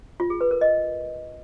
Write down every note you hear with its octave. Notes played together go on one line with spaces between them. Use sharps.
F4
G#4
B4
A#4
D#5